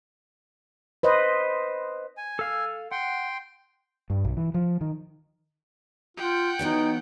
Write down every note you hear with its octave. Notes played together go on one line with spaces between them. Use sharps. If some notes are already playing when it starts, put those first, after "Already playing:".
B4 C5 D#5
G#5
A4 F5 E6
F#5 G5 C6
G2
B1
E3
F3
D#3
F4 F#5 G5
E3 F#3 B3 D#4